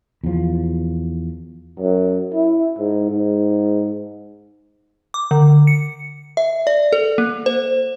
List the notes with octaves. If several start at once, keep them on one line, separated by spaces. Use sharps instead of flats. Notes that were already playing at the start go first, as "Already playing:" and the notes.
E2 F3
F#2
E4
G#2
G#2
D6
D3
C#7
E5
D5
A4
A#3
C5